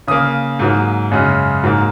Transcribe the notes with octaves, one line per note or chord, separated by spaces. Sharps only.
C#3 A#3 D#6
G#2 F#3 A#3
F#2 C#3 G#3
G#2 F#3 A#3 A#5